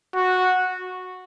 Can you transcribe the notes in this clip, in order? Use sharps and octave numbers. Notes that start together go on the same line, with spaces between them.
F#4